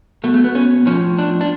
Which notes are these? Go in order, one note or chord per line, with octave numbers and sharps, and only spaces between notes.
B2 A3
A3
B3
C#4
A2 F3 C#4
D4
D4